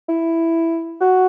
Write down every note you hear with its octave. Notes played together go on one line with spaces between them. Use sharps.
E4
F#4